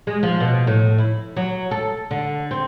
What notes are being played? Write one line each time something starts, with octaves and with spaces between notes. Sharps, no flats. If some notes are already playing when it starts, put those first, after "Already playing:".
G#3
F3
B2
A2
E4
F#3
A4
D3
C4